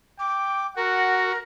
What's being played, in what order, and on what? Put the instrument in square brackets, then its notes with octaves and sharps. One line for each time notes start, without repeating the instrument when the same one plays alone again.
[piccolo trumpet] G5 [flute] D6
[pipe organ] F#4 [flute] A#4 [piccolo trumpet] F#5